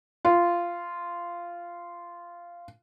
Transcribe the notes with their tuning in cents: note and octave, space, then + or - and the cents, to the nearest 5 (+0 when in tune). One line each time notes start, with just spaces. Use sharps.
F4 -10